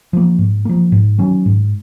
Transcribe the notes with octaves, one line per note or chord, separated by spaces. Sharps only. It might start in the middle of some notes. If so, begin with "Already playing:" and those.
F3 A#3
G#2
F3 A#3
G#2
D#3 F#3 C#4
G#2